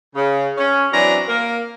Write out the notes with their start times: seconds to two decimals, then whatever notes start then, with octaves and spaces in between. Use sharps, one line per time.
0.15 C#3
0.57 C#4
0.93 E3 F#3 C4 D4 A#5
1.28 A#3 A#4